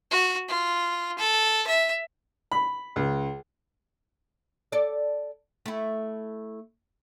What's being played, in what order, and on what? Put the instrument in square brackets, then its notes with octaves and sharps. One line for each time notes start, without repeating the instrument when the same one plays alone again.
[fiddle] F#4
F4
A4
E5
[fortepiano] B5
C#2
[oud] A4 D5
A3 E4